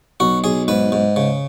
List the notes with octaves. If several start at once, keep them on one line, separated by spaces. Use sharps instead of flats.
B1 F#4
B1 G#4
G#2 B4
G#2
C#3